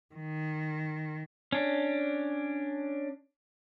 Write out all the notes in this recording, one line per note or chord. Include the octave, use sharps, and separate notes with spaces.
D#3
C#4 D4